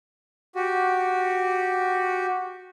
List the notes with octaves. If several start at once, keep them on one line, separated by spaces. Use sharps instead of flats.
F#4 G4